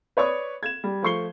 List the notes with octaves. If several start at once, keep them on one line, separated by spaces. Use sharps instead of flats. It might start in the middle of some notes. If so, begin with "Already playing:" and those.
B4 C#5 D5 C#6 D#6
G#6 E7
G3
F3 A3 C#6 C7 G7